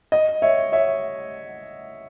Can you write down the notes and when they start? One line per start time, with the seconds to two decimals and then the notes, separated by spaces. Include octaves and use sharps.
0.12 D#5
0.42 C#5 E5
0.72 C#5 E5